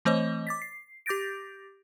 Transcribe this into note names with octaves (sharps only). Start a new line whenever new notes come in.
E3 A3 C4 C5 C#5 D#5
D6 A6 B6
C7
G4 D6 G6 A6 A#6 D7